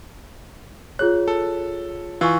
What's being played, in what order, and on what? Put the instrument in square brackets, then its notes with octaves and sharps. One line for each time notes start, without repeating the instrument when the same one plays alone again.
[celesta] F4 G#4 C#5 [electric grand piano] F#6
[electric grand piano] A4
[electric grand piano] E3 F4 [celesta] G#5 C#6 E6